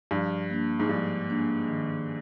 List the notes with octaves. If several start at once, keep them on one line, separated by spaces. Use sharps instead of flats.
G2 F3
A#3 D4
G#2
G2 F3
A#3 D4
D#3